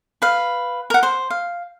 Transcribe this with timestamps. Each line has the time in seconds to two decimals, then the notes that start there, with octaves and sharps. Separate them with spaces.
0.22 B4 F5
0.90 A#4 F#5
1.03 C5
1.30 F5